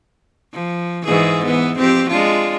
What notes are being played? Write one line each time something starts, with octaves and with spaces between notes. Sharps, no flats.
F3
G#2 E3 G#4
E3 B3
F2 C4 G4
G#3 D4 F4